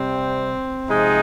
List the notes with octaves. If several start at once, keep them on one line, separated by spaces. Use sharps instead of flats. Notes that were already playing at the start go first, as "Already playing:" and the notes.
Already playing: C3 G3 C4
C3 F3 G#3 D#4